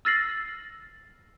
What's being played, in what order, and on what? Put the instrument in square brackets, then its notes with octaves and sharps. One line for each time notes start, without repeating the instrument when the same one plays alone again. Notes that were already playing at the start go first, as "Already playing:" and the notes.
[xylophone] E6 F6 A6 A#6 C7 F#7